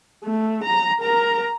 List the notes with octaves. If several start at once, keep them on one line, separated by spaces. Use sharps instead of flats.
A3
A#5
A#4 A#5